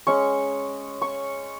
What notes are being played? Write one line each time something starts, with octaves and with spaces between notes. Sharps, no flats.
G#3 C#4 C#6
C#6